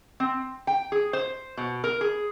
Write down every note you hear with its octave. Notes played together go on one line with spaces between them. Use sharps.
C4
G5
G#4
C5
B2
A#4
G#4